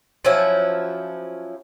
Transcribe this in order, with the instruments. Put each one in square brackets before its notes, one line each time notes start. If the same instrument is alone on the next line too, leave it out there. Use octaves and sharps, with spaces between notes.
[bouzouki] F3 F#3 C#4 E4